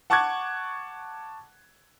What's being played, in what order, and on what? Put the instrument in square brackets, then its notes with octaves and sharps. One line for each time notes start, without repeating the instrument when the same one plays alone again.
[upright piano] F#5 A5 C#6 D6 F#6 G#6